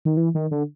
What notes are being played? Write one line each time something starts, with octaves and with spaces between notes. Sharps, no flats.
D#3
E3
D#3
D3